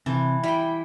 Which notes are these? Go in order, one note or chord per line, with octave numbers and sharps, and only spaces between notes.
C3 E3 A5
G3 E4 G5